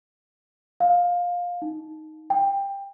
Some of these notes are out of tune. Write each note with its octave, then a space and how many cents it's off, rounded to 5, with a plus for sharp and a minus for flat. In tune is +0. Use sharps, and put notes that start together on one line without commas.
F5 +15
D#4 +5
G5 +15